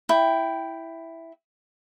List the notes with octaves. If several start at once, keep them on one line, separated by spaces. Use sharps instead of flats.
E4 G5